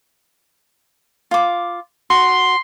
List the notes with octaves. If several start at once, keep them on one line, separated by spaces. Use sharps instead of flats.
F4 D6
F#4 C6